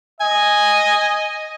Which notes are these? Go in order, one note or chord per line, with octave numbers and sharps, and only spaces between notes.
D#5 G#5